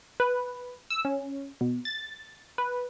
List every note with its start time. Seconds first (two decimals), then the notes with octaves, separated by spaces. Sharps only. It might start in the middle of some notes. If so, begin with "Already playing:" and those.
0.20 B4
0.90 E6
1.05 C#4
1.61 B2
1.85 A6
2.58 B4